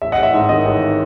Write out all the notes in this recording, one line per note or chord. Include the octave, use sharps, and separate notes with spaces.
A1 E5
D#5 F#5
A1
E5
G#2 E5
D#3 D#5
A1